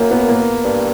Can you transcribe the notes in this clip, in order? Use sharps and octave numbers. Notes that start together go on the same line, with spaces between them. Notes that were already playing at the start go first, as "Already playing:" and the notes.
Already playing: F#2 A#3
B3
A#3
G2